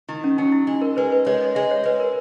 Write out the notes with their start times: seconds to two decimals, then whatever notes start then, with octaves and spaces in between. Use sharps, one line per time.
0.08 D#3 E4
0.24 C#4
0.38 F#3 D#4
0.52 E4
0.67 G#3
0.82 A#4
0.97 G#3 B4
1.12 B4
1.26 G#3 C#5
1.41 D#5
1.55 G#3 E5
1.71 C#5
1.86 G#3 B4
2.00 A#4